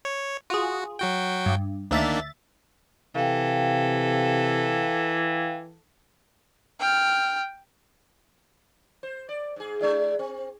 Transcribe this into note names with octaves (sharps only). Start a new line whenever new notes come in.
C#5
F4 F#4 G#4
F#3 F#4 G5
G2
D2 D#3 A#3 D4 E5 A6
C3 E3 A4 F5 G5
G5 F6
C5
D5
G#2 G#4
G#3 D4 E4
C4